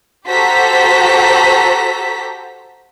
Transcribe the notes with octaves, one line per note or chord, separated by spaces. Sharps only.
F#4 G4 A4 C5 A#5 B6